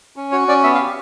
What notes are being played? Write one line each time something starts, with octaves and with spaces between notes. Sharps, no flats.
C#4
F#4 C#5
C#4 D5
B3 E5
F5
G4